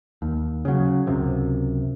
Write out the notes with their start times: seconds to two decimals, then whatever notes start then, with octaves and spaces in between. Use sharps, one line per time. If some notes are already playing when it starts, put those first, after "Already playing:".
0.22 D#2
0.65 C#3 F#3
1.07 C#2 F#2 C3